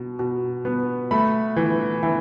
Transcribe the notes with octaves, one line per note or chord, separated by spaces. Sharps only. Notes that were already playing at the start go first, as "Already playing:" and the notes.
Already playing: B2
B2
B3
A3 B5
E3
E3